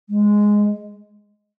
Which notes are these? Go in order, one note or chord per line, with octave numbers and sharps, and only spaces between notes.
G#3